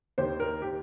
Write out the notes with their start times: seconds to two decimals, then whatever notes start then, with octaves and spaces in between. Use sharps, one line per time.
0.18 D#2 D#3 G4 C5
0.40 A#4
0.62 G4